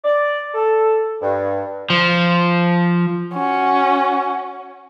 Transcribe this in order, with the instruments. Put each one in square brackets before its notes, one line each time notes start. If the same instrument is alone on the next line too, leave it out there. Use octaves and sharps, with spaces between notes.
[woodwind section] D5
A4
G2
[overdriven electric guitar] F3
[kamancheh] C#4 F#4